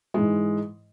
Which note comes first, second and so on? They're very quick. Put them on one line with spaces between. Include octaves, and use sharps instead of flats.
G#3 E3 G#2